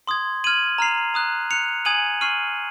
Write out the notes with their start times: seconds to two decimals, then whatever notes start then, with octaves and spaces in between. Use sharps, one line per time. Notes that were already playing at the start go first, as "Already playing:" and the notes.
0.07 C6 D#6 G#6
0.44 F6 G#6 D#7 F#7
0.78 A#5 F6 C7 F7
1.14 A#5 D#6 F#6
1.51 F#6 C#7 F7
1.85 G#5 D#6 G#6 D#7 F#7
2.21 C#6 F6 C7 D#7 F#7